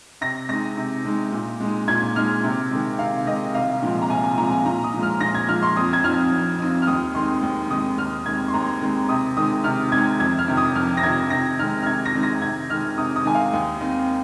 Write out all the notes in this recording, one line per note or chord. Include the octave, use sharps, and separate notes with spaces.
C3 A#6
G#3 D#4 A#6
C3
G#3 D#4
A#2
G#3 D#4
A#2 G#6
G#3 D#4 F6
C3
D#3 G#3
C3 F5
D#3 G#3 D#5
C2 F5
A#2 F3 G#3 C4
A#5
C2 G#5
G#5
A#2 F3 G#3 C4 A#5
G#5
A#2 A#5
D#6
F3 G#3
F6
A#2 A#6
G#6
F3 G#3 F6
C6
F2 D#6
G#6
F3 C4 D#4 F6
F2
F3 C4 D#4
F6
D#2 D#6
D#3 G#3 C4 D#4 C6
D#2
D#3 G#3 C4 D#4 D#6
D#2 F6
D#3 G#3 C4 G#6
C6
D#2 A#5
D#3 G#3 C4
C3 D#6
D#3 G#3 D#4 D#6
C3 F6
D#3 G#3 D#4 G#6
F2 G#6
F6
C3 D#3
D#6
F2 F6
A#6
C3 D#3 G#6
C3 A#6
D#3 G#3 C4 D#4 F6
F6
C3 G#6
A#6
D#3 G#3 C4 D#4
A#6
C3 G#6
D#3 G#3 D#4 F6
C3 D#6
D#6
D#3 G#3 D#4 G#5
F5
D#2
D#3 C4 D#4